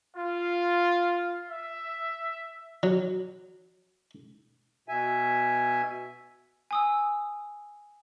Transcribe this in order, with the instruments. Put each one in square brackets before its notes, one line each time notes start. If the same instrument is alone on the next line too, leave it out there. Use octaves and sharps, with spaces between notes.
[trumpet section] F4
E5
[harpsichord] F#3
[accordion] B2 E5 G#5
[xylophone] G#5 D#6 E6